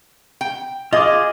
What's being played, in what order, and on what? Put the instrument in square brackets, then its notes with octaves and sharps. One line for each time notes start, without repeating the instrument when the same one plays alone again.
[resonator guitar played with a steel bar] G5
[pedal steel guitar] F4 G#4 D6 [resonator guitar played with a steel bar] D#5